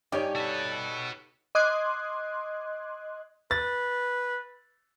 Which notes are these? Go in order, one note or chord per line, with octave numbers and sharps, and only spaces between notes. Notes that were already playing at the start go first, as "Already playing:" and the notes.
G2 D#4 G4 C#5 D5 G#5
F#4 A4 B4
D#5 C6 D6 D#6 F#6 G#6
B4 A6